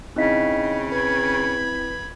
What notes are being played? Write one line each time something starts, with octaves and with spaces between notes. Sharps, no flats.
C#3 C4 D#4 E4 D#5 F5 B6
B4 B5 G#6